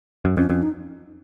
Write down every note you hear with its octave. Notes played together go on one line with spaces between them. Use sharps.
F#2
F2 C#4
F2 C#4
D#4